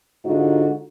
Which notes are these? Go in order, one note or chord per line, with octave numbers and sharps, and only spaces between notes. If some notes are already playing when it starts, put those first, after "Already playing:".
G#2 D3 D#4 F4 F#4